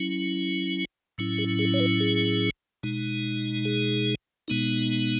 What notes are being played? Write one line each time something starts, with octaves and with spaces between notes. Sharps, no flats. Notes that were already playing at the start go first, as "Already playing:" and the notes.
Already playing: F#3 C#4 E4
A2 F#3 C#4 E4
G#4
G#4
C#5
B4
G#4
B2 G#3 D#4
G#4
B2 G#3 B3 D#4